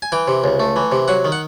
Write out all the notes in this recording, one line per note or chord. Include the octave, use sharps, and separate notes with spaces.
G#5
E3 G5
C3
C#2
A3
E3
C3
F#3 F#5
D#3
F#5